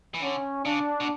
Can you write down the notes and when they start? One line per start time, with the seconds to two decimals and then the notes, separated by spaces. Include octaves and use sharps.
0.14 E3
0.22 D3 C#4
0.65 C#3 D4
1.00 B2